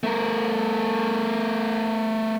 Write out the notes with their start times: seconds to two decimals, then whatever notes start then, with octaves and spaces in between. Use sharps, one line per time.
0.03 A3 A#4